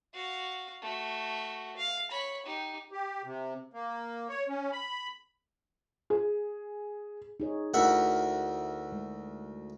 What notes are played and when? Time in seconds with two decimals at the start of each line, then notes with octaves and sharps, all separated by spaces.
0.14 F#4 F5
0.82 A3 F#4
1.77 F5
2.11 C#5 B5
2.46 D#4 G4
2.92 G4
3.24 C3
3.74 A#3
4.29 C#5
4.48 C#4
4.73 B5
6.10 G#4
7.40 D#4 G#4 C#5
7.74 D2 E4 A#4 E5 F#5
8.92 G#3